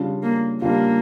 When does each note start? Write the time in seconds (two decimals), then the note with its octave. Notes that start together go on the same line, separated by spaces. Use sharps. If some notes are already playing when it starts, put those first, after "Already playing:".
Already playing: C#3 G3 D4 F4
0.23 A#3
0.62 C#3 G3 A#3 D4 F4